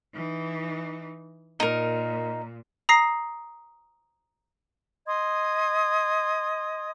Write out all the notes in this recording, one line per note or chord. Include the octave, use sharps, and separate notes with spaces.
E3 D#4
A#2 D#4 A#4
A#5 D#6 A#6 C7
D#5 C6 D#6 G#6